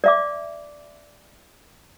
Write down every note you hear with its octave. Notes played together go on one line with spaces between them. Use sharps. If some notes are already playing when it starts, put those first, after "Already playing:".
D5 E5 D6